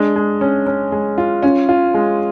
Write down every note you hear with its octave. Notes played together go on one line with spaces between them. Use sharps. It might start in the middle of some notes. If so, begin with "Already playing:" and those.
Already playing: G#3 D4
G#3
C#4
C#4
G#3
F4
C#4 F4
F4
G#3